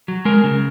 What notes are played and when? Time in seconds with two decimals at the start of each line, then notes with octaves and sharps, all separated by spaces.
0.08 F#3
0.25 G#3 A#4
0.44 C#3